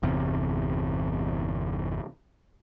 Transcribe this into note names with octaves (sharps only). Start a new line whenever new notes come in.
G1 E2 C3